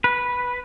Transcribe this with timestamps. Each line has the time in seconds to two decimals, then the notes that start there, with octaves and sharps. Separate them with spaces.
0.04 B4